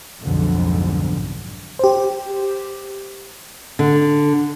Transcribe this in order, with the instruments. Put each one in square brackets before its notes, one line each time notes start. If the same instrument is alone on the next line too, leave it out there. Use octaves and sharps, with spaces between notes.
[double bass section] B1 F2 G#2 D3
[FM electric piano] G4 C5
[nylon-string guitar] D3